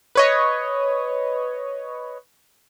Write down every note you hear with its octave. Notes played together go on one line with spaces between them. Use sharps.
B4 C#5 D#5